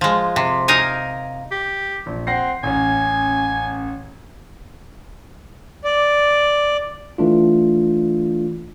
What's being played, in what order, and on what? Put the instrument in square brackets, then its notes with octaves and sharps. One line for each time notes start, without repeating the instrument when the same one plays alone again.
[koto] F3 G#3
C3
D#4 A#4 D#5 F5 G#5
[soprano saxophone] G4
[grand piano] A#1
[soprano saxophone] C4 [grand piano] F#5 A#6 C7
[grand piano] A1 C#4 [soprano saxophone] G#5
[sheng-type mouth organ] D5
[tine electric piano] E3 A3 D4 F4